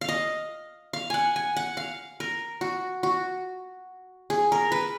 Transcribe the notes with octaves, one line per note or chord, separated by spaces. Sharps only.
F5
D#5
F5
F#5 G#5
G#5
F#5
F5
A#4
F#4
F#4
G#4
A#4
B4